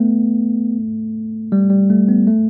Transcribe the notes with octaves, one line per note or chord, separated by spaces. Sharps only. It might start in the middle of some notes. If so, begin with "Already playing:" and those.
Already playing: A3 B3
G3
G3
A3
B3
A3